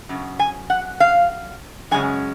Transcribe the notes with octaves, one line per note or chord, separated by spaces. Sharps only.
F#2 C#3
G#5
F#5
F5
F#2 C#3 G#3 C#4 G#5